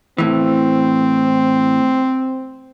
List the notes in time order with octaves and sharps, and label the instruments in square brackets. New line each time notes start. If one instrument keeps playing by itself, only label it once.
[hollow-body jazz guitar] A2 E3 [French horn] C4